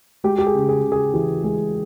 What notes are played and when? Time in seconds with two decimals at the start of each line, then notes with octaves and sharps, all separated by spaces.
0.24 G#3 G4
0.38 G4
0.46 G#4
0.54 C#3
0.69 G#4
0.84 C#3
0.92 G#4
1.14 E3 G4
1.44 G#3 G#4